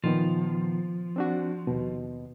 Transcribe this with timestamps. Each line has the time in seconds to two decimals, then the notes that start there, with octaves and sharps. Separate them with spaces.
0.04 A#2 D#3 F3 B3
1.16 C4 D4 F#4
1.67 D#2 B2